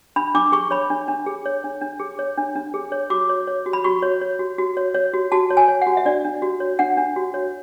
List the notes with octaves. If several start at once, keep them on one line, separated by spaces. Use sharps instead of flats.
D4 B5
D4 D6
G#4 C#6
C#5 B5
D4
D4
G#4
C#5
D4
D4
G#4
C#5
D4
D4
G#4
C#5
F#4 D6
C#5
C#5
F#4
B5
F#4 C#6
C#5
C#5
F#4
F#4
C#5
C#5
F#4
F#4 A5
C#5
G#5
C#5
F#4 F#5
E5
D4 D5
D4
F#4
C#5
D4 F#5
D4
F#4
C#5